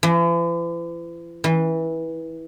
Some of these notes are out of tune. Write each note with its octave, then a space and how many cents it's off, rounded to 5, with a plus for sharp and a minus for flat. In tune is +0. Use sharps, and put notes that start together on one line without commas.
E3 +45
E3 -20